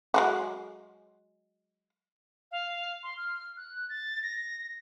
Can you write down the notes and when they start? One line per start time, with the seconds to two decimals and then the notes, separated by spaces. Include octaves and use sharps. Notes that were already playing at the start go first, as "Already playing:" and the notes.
0.14 F#3 G#3 F#4
2.51 F5
3.03 C6
3.17 F6
3.57 F#6
3.89 A6
4.23 A#6